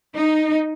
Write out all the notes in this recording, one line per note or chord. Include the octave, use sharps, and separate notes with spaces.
D#4